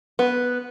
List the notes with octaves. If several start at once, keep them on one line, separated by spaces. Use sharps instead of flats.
B3